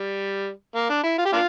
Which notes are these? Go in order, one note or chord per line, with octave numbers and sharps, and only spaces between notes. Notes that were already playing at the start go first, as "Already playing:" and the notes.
Already playing: G3
A#3
D4
E4
F4
G4
A#3 D4 F4